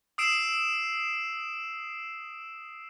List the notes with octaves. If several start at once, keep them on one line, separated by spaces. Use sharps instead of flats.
D#6 E6 C7 D7 E7